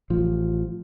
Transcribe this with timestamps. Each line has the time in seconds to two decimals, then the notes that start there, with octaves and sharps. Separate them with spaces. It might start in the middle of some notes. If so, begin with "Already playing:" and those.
0.10 A1 F3